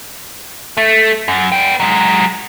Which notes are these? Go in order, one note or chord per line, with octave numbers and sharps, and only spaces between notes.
A3
F#2
B3 G5
F#3 G#3